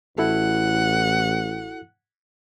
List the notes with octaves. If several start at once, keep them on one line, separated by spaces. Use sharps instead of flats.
A1 E4 F#4 A4 F#5